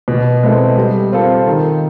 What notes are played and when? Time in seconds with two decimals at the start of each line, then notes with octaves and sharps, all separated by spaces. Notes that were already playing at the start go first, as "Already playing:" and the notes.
0.08 B2
0.43 G#3 C4 E4 A4
0.77 G3
1.12 C4 F4 A4
1.47 D#3